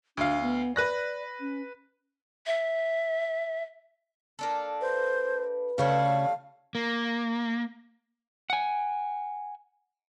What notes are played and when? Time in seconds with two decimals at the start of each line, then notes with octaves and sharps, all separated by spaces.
0.17 D2 D4 F5
0.42 B3
0.76 B4 D5 F#6 A#6
1.40 C#4
2.46 E5
4.39 A#3 D4 A4
4.82 B4 C5
5.78 D2 C#3 G3 A3 E4 C#5 F5
6.75 A#3
8.50 F#5 G#5